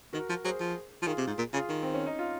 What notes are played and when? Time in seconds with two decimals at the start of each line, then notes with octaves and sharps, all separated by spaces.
0.13 D#3 F#4 A#4
0.29 F3
0.44 F#3 G#4 C5
0.60 F3
1.02 F3
1.06 D#3 F4 G#4
1.18 C3
1.27 G#2
1.38 A#2
1.53 C#3 F4 G#4
1.69 D#3
1.83 C4
1.94 C#4
2.06 D#4
2.19 F4